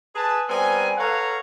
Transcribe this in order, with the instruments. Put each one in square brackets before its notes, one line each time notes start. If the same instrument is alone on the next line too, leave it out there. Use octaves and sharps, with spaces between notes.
[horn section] G#4 B4 A5
G3 B3 C4 A#4 G#5
A4 B4 C#5 F5 F#5 A#5